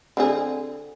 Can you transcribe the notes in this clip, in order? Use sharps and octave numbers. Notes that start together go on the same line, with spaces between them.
D3 C4 G#4